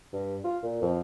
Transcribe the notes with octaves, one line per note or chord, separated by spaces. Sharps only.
G2
F4
A#2
F2